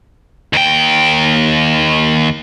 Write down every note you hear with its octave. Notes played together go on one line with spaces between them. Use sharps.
D#2 G5